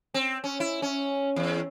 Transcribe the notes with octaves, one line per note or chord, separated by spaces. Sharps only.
C4
C#4
E4
C#4
E2